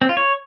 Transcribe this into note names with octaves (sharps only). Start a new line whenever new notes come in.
C4
F4
C#5